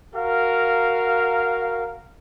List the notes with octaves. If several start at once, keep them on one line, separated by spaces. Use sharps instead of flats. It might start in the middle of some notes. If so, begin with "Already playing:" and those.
F#4 A#4 F5